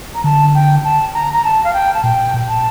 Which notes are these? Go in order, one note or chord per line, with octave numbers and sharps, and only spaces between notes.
A#5
D3 A5
G5
A5
A#5
A#5
A5
F5
G5
A5
A#2 G5
A#2
A5